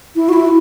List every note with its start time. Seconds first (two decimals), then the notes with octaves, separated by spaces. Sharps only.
0.16 E4
0.29 F#4
0.33 E4